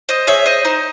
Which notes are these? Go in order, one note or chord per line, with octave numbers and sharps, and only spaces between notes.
C5 D#5
G#4 C#5 E5
C5 D#5
D#4 C5